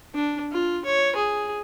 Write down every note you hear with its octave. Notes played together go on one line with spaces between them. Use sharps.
D4
F4
C#5
G#4